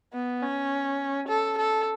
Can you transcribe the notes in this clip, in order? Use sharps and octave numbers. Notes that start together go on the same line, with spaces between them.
B3
C#4
A4
A4